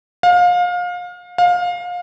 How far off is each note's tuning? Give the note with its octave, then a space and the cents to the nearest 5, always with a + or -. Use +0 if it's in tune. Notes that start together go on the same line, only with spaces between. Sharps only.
F5 +30
F5 +25